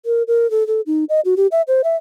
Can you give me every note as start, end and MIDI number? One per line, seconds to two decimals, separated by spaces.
0.06 0.23 70
0.28 0.50 70
0.51 0.66 69
0.67 0.81 69
0.87 1.04 63
1.09 1.20 75
1.25 1.35 66
1.37 1.47 67
1.52 1.62 76
1.68 1.82 72
1.84 1.96 76